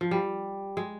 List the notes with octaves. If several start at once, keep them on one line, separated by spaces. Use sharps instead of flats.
F3
G3
G#3